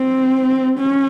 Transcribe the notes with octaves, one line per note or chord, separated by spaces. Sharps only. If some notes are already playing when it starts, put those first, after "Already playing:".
Already playing: C4
C#4